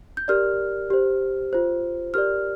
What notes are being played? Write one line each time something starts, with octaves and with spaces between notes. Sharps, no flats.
G6
G4 A#4 D5 F6
G4 C5
F4 C5
G4 A#4 D5 F6